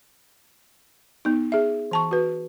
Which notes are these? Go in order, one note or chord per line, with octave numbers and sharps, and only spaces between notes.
B3 D#4
G#4 E5
E3 A5 C#6
F#4 B4